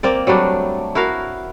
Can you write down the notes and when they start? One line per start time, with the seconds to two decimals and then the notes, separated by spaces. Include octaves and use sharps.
0.03 A#3 C4 D5
0.27 F#3 G3 A3 D4
0.95 E4 F#4 A#4 F5